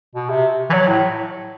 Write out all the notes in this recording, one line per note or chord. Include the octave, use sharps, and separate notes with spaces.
B2
C3
E3
F#3
A2